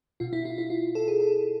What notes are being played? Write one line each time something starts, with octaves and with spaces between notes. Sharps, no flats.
B2 F4
E4
F4
E4
F4
A4
G#4
A4